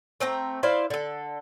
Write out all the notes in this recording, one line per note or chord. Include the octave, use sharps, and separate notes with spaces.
A3 C4 G5 A#5
E4 C5 D5 F5
D3 A4